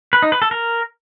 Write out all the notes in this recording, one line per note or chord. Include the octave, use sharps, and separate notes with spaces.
B4
D#4
B4
A4
A#4